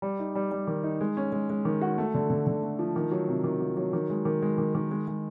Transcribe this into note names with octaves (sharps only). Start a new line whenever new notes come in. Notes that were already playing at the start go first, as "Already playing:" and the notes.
G3
D#4
G3
G3
D#3
D#4
G#3
C#4
G#3
G#3
D#3
F#4
A3
D3
D3
D3
A3
F3
D#3
F#3
C3
D#3
F#3
F#3
D#3
G#3
D#3
G#3
D#3
D#3
G#3
G#3